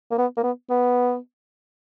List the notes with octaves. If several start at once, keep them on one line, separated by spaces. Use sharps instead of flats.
A#3
B3
A#3
B3
B3